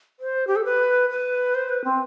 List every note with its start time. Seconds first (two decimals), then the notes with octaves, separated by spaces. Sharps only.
0.20 C5
0.47 G4
0.56 A4
0.65 B4
1.10 B4
1.55 C5
1.69 B4
1.84 C4